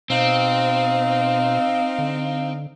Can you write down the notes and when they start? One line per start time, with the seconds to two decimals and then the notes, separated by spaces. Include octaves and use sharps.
0.10 B2 C4 D#4 F5
1.99 D3